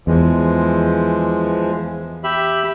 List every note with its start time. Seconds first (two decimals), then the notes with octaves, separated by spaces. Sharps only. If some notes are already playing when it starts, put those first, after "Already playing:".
0.07 E2 E3 F3 G#3
2.24 G4 E5 B5